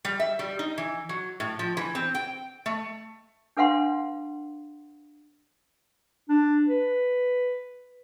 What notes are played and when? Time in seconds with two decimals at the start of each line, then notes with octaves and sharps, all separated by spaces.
0.05 G3
0.20 E5
0.39 G3
0.59 D#4
0.78 E3
1.09 F#3
1.40 A2
1.59 F3
1.77 E3
1.95 C4
2.15 G5
2.66 A3
3.57 D4 A4 B4 F5 F#5 C6
6.29 D4
6.67 B4